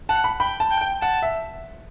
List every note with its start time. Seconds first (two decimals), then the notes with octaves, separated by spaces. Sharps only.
0.09 F#5 A5
0.24 B5
0.40 G5 B5
0.60 A5
0.71 G5
0.81 G5
1.01 F#5 A5
1.22 E5